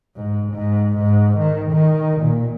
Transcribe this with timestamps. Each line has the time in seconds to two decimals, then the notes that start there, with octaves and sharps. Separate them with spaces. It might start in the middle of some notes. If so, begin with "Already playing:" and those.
0.16 G#2
0.53 G#2
0.98 G#2
1.38 D#3
1.71 D#3
2.21 A#2